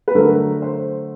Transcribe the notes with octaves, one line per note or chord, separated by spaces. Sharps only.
B4
D3 F#3 A3 A#4
C5